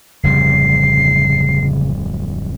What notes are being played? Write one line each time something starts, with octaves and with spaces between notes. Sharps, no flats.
D1 F2 C#3 G3 C7